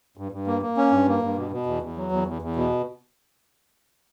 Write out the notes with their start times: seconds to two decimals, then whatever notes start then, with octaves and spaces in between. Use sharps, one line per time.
0.17 G2
0.32 G2
0.47 A#3
0.62 A#3
0.77 C#4
0.91 G2
1.07 A#3
1.22 G2
1.37 B2
1.52 B2
1.66 E2
1.82 E2
1.96 F#3
2.12 E2
2.27 E2
2.42 E2
2.56 B2